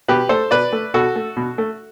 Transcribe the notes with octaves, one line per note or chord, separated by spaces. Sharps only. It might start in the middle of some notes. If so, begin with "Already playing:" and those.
B2 G4 B4
A3 A4 C5
B2 B4 D5
A3
B2 F#4 A4
A3
B2
A3